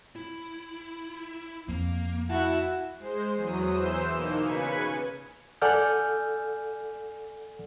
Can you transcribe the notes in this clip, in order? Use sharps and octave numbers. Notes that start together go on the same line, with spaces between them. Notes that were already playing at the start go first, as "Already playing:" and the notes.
E4
F2 A#3
E4 F#4 A5
G#3 C5
E2 F#3 D#6
E3 C5 E6 G6 E7
B2 A#3 D#4
C#3 B4 G#5 G#6 B6 C#7
A4 D5 F#5 G#5 F6 G6